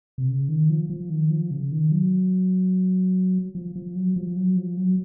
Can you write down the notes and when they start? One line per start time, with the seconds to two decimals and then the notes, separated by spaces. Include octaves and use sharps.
0.18 C3
0.28 C#3
0.48 D#3
0.70 F3
0.90 F3
1.10 D#3
1.30 F3
1.51 C#3
1.71 D#3
1.91 F#3
3.55 F3
3.76 F3
3.96 F#3
4.16 F3
4.36 F#3
4.57 F3
4.77 F#3